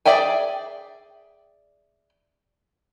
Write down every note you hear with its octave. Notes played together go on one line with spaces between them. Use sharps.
G#4 D5 E5 G5 G#5